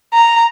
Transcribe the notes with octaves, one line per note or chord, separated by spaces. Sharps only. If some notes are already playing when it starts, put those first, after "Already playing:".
A#5